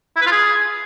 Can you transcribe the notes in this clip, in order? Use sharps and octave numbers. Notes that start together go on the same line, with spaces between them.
E4
B4
F4
G#4